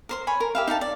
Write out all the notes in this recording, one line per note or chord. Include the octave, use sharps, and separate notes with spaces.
A#4 C5 C6
C#5 G#5 B5
A#4
G4 E5 F5
D#4 E5 F5 A5
D5